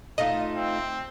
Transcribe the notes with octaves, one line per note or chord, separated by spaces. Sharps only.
A3 D#4 F4 D#5
C4